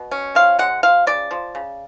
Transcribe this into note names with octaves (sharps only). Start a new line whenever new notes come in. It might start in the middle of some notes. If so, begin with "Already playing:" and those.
Already playing: B2
C#4
F3 F5
G#3 F#5
F3 F5
C#3 D5
F3
C#3